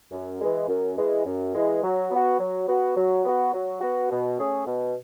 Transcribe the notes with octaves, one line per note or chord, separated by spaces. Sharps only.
F#2
E3 G#3
F#2
E3 G#3
F#2
E3 G#3
F#3
B3 F#4
F#3
B3 F#4
F#3
B3 F#4
F#3
B3 F#4
B2
A3 C#4 G#4
B2